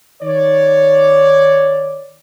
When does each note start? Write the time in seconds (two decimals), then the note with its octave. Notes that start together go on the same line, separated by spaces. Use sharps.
0.22 D#3 C#5 D5